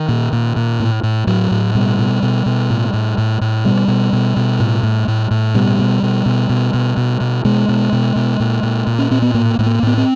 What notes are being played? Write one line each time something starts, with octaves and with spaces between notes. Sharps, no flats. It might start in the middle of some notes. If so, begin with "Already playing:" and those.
Already playing: D#3
A#2
A#2
A#2
A2
A2
A2 F#3
A2
B2 G3
B2
B2
B2
A2
A2
A2
A2
B2 G3
B2
B2
B2
A2
A2
A2
A2
B2 G3
B2
B2
B2
B2
B2
B2
B2
B2 G#3
B2
B2
B2
A#2
A#2
A#2
C#4
A#2 C4
B3
A2 A#3
A2 A3
A#3
A2 B3
C4